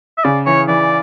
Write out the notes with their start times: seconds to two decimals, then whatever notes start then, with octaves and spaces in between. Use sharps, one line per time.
0.18 E5
0.24 C#3 D5
0.46 E3 C#5
0.68 E3 D5